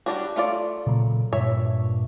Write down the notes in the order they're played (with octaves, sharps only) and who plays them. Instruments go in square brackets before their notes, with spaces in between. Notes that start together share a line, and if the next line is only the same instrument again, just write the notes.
[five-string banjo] G3 D4 F#4
A3 F4 D5
[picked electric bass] A#2 C#3 F#3
[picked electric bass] G2 A#2 [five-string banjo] C#5 E5